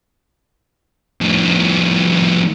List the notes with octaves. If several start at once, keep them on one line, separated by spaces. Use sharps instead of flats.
F2 A2